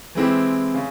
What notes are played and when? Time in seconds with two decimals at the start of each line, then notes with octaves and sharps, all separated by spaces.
0.15 E3 G#3 C4 E4 G4
0.74 C#3